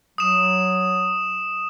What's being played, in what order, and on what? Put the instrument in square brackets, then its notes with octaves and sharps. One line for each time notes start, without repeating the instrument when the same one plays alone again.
[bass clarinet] F#3 [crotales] D#6 E7